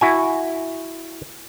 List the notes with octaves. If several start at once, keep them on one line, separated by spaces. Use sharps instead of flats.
E4 F#4 G#5